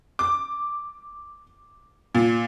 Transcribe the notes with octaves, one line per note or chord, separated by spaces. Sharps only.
D6
A#2